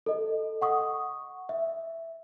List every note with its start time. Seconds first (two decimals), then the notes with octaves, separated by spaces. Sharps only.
0.06 A4 D#5
0.62 F#5 C#6 D#6
1.49 E5